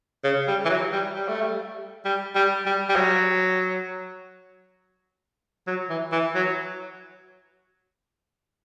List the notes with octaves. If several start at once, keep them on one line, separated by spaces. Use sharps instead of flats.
C#3
G3
E3
F#3
G3
G3
A3
G3
G3
G3
G3
G3
F#3
F#3
E3
E3
F#3